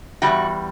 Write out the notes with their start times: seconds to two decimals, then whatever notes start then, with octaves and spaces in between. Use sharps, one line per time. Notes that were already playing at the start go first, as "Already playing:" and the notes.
0.22 E2 B2 G3 F#4